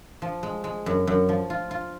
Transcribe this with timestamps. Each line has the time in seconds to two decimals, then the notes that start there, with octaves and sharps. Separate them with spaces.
0.22 F3
0.43 G#3
0.64 G#3
0.86 F#2
1.07 F#2
1.29 F3
1.50 F4
1.71 F4